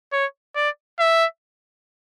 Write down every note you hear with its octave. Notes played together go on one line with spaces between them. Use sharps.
C#5
D5
E5